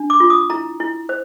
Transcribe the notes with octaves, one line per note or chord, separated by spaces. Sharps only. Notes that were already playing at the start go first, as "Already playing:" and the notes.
Already playing: D4
D6
F4
D#6
E4 A#5
E4
C5